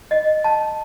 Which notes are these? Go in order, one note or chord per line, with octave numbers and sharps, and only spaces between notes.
D#5
A5